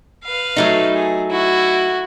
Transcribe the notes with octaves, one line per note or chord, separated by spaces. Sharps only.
B4 F5
F#3 A3 D#4
G#4
E4 F#4